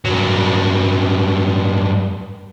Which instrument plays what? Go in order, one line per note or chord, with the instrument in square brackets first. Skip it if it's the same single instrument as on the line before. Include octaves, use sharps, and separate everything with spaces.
[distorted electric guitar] G2 F#3